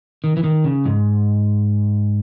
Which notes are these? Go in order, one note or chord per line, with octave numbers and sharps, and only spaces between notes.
D#3
E3
D#3
C#3
G#2